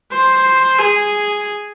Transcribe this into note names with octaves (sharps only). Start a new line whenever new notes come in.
C5
G#4